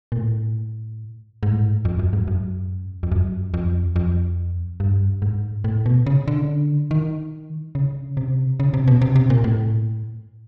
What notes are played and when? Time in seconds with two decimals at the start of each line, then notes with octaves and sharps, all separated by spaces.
0.12 A#2
0.16 A2
1.43 G#2
1.52 A2
1.60 G#2
1.85 F2
1.99 F#2
2.13 G#2
2.28 F#2
3.03 F2
3.12 F#2
3.54 F2
3.96 F2
4.80 G2
5.22 G#2
5.64 A2
5.86 B2
6.06 C#3
6.28 D3
6.91 D#3
7.75 C#3
8.17 C3
8.60 C#3
8.74 C3
8.88 B2
9.01 C3
9.16 C3
9.30 A#2
9.44 A2